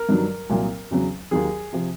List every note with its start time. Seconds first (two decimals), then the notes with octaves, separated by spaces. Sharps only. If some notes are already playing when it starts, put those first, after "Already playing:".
Already playing: A#4
0.09 G2 D#3 F#3
0.50 C2 A#2 F#3
0.91 E2 C#3 F#3
1.31 D#2 D#3 F#3 G#4
1.73 C3 F3